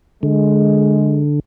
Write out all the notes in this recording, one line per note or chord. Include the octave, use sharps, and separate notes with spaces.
D3 G#3